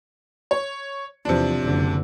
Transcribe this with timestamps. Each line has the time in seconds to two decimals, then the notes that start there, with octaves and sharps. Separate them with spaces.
0.51 C#5
1.25 E2 C3 F3 D4
1.60 F#1 D3